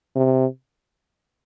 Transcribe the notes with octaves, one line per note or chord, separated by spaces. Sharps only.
C3